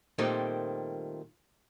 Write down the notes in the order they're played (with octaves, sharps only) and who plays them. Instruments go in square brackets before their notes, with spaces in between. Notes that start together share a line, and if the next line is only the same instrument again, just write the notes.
[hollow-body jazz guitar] A#2 D#3 G3 A3 C4